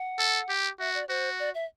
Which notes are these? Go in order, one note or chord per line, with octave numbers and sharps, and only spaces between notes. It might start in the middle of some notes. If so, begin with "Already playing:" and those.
Already playing: F#5
A4
G4
F#4 E5
D5
F#4 C5
D5
E5